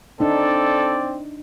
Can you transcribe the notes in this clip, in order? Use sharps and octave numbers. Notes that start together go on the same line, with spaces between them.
C4 D4 D#4 A4 D5